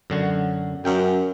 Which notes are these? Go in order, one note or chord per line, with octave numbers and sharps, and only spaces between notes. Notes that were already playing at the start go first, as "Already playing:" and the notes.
F#2 D3 F#4
F#2 G5